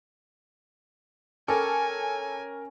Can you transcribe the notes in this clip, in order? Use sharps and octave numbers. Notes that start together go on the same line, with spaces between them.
C#4 A4 A#4 G5 G#5 D6